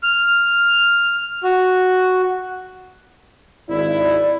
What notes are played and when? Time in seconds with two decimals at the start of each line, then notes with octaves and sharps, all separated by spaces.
0.03 F6
1.44 F#4
3.69 G#1 E4 D5